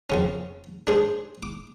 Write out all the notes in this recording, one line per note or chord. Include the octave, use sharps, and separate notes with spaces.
F2 C#3 C#4
D4 G#4 C5
D6